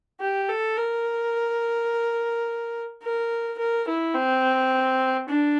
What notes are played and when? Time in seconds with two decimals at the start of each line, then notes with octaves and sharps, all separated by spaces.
0.20 G4
0.49 A4
0.77 A#4
3.03 A#4
3.58 A#4
3.87 E4
4.15 C4
5.29 D4